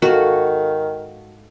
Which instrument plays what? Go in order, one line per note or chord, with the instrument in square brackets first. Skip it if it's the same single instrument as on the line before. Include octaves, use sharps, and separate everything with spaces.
[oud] G#2 A4 F5 [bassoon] D#3 [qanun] F#4